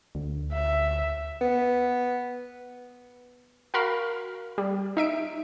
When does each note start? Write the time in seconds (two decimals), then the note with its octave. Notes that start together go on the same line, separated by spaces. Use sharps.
0.15 D2
0.53 E5
1.41 B3
3.74 F#4 A#4 F5 B5
4.58 G3
4.97 D#4 E5 D7